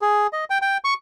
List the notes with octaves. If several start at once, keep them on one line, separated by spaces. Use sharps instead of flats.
G#4
D#5
G5
G5
C#6